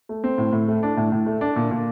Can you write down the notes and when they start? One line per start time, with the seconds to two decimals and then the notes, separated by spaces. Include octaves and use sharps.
0.09 A3
0.24 C4
0.38 A2
0.53 A2
0.68 A3
0.83 D4
0.97 A2
1.12 A2
1.26 A3
1.41 D4
1.56 A#2
1.71 A#2